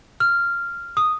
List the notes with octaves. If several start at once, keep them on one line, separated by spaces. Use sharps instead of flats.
F6
D#6